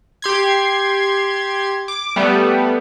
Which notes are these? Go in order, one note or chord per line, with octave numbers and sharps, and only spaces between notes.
G4 C6 G#6
D6
G3 A3 B3